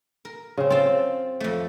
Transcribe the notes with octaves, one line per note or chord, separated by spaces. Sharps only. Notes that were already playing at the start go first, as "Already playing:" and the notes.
A#4
C#3 C4
C4 F4 A5
F2 A3